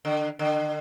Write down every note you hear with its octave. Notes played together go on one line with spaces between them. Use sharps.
D3
D3